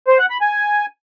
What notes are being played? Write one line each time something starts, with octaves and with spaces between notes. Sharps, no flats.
C5
F#5
B5
G#5